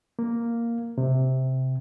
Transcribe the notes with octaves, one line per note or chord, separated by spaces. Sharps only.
A#3
C3